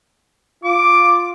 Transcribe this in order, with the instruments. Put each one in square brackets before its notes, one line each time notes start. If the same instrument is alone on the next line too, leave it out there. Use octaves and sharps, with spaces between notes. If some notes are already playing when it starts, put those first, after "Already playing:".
[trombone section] F4 [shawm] D6